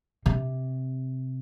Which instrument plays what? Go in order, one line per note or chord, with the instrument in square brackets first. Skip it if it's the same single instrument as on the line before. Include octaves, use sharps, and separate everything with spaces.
[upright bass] C3